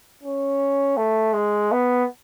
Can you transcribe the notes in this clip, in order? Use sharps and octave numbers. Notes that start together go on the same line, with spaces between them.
C#4
A3
G#3
B3